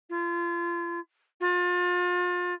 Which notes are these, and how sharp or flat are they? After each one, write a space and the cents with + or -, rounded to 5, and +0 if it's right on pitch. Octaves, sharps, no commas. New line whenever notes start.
F4 -30
F4 +35